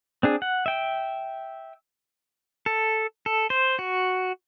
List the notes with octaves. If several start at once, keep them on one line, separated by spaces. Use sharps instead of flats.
C4 D4 G#4
F#5
E5 G5
A4
A4
C5
F#4